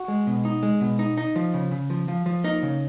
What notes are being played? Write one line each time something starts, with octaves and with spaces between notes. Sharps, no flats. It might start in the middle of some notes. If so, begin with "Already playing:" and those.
Already playing: F#4 F#5
G#3
B2
D#4
G#3
B2
D#4
D#4
F3
C#3
C#3
F3
F3
F3
A#3 D#4 D#5
C#3